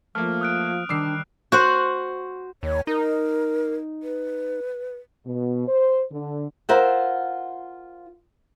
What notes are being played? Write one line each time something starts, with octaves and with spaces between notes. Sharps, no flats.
F3 A3 A#3 F6
D#6 F#6 D7
D#3 G3 D4 D6 E6 C7
F#4 C5 F#5
D#2 C#5
D#4 A#4
B4
B2
C5
D3
F4 A#4 C5 E5 F#5